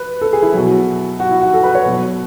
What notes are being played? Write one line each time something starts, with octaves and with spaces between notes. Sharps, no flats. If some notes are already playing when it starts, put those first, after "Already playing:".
Already playing: B4
A4
G#4
E4
B2 F#3
F#4
E4
F#4
A4
B4
C#5
B2 F#3